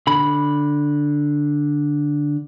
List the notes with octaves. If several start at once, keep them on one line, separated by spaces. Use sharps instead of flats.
D3 B5